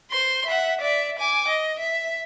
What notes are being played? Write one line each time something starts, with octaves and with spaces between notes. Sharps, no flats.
C5 C6
E5 F#5
D5 E5
G#5 D6
D#5
E5